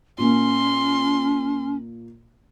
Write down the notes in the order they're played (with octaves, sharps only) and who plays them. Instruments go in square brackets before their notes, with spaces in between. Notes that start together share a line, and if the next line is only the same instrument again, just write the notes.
[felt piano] A#2 A#3 [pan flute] C#4 [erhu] C6